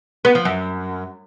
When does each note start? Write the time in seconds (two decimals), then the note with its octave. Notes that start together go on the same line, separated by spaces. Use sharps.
0.25 B3
0.35 F3
0.45 F#2